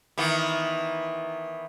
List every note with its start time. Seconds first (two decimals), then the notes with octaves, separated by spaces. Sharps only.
0.18 D#3 E3 B3